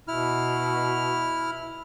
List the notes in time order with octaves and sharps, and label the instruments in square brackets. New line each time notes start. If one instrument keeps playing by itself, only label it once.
[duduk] B2 [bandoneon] E4 F6